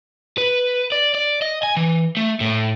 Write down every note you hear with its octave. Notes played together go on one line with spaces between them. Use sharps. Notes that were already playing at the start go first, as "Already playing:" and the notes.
B4
D5
D5
D#5
G#5
E3
A3
A2